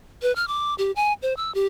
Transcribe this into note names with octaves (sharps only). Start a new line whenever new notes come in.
B4
F6
D6
G4
G#5
C5
E6
G4